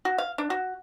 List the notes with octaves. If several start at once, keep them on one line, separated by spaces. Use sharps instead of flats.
F#4
F5
D4
F#4